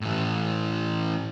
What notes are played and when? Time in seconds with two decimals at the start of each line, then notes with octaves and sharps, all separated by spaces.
0.01 A2 E3